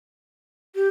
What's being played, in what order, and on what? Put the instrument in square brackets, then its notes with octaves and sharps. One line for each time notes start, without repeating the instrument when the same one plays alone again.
[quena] G4